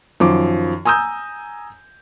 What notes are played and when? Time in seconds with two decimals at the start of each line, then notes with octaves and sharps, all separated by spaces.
0.20 F#2 D#3 F3 D6
0.85 G#5 A#5 D#6 E6 G6